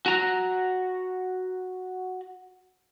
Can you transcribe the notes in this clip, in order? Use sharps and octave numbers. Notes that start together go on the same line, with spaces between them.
F#4 A#5